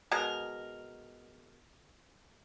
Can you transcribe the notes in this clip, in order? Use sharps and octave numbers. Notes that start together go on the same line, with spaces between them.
B2 G#3 A#4